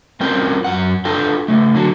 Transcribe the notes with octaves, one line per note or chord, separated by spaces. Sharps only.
G3 C4 C#4 F4 A#4 G5
F#2 F#5
D4 F4 A4 G5
C#3 A3
D3 F#3